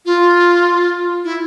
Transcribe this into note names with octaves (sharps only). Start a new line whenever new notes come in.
F4
E4